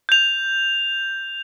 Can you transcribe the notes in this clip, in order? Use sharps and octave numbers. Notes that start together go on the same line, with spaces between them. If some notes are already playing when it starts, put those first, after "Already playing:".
G6 F7